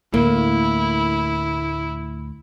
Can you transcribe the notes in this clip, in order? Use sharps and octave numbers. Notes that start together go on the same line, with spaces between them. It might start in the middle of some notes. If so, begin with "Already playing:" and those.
D2 A2 A#3 E4